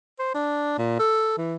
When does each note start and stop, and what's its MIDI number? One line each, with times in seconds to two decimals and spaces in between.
0.19 0.30 72
0.35 0.76 62
0.78 0.95 46
0.99 1.35 69
1.38 1.56 52